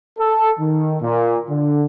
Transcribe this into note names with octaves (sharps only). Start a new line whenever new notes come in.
A4
D#3
A#2
D3